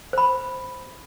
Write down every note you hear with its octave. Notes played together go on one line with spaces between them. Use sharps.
C5 B5